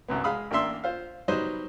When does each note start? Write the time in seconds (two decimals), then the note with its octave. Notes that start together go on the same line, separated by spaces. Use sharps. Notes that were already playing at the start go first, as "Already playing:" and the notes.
0.08 C2 F#2 B3
0.24 G#3 F5 B5 D#6
0.51 A1 A#3 D4 E5 C6 E6
0.84 F4 C5 F5
1.28 F#3 G3 B3 D#4 C5 D#5